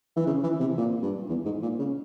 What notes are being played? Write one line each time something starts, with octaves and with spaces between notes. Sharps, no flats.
E3
C#3
E3
C3
A#2
G2
E2
G#2
A#2
C#3